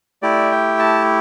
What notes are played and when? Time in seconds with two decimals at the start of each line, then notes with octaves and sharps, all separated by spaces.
0.22 A3 E4 G4 D5
0.51 G5
0.79 A5